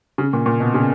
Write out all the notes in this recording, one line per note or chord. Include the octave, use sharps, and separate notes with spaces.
C#3
A#2
A#2
B2
C#3